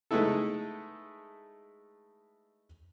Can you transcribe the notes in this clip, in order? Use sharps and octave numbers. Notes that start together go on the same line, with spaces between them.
G#3 A3 B3 D#4 E4 A4